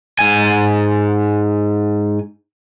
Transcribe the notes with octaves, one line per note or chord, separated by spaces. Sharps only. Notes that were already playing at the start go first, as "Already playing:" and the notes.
G#2 G#5